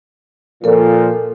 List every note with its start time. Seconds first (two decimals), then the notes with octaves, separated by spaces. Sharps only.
0.64 A#2 F3 A4 A#4